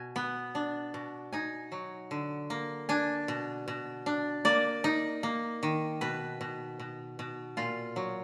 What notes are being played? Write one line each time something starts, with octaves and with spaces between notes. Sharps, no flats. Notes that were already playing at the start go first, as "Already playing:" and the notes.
Already playing: B2 G#5
B3
D4
B2
D#4 G#5
F#3
D3
A#3
D4 G#5
B2
B2
D4
A#3 D5
D#4
A#3
D#3
B2 B4
B2
B2
B2
A#2 F4
F#3